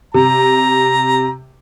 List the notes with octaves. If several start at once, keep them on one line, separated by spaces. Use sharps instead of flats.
C3 A#5